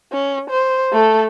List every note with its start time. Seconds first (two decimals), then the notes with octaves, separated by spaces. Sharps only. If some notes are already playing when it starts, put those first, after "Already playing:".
0.12 C#4
0.50 C5
0.93 A3 A4